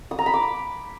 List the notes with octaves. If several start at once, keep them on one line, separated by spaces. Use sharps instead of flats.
D#6
A#5
B5
D6